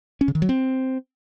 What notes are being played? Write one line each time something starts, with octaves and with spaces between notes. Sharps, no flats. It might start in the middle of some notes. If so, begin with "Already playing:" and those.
C#4
C#3
D#3
F#3
C4